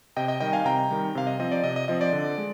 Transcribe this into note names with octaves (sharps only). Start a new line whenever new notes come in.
C3 D#5 G5
D#5 G5
D#3 G3 D#5 G5
F5 G#5
C3 G5 A#5
D#3 G3
C3 F5
D#5
F3 C4 D#5
D5
C3 D#5
D#5
F3 C4 D#5
D5
D3
G#3